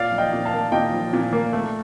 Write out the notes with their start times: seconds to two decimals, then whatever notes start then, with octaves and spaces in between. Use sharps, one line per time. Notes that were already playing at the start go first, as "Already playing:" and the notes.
Already playing: A#2 D5 F5
0.11 F3
0.18 D#5 G5
0.33 A#2
0.45 F5 A5
0.52 A#3
0.72 A#2 D#5 G5
0.92 F3
1.13 A#2
1.33 A#3
1.53 A3